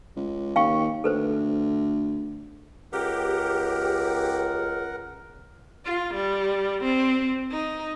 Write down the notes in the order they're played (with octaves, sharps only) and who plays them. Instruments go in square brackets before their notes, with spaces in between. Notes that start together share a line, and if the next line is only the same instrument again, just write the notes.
[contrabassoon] C#2
[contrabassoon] D#2 [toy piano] F5 G5 C#6
[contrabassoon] D2 [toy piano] A4 B4 C5
[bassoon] C#2 [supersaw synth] G4 [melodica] A#4 F#5
[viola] F4
G3
C4
D#4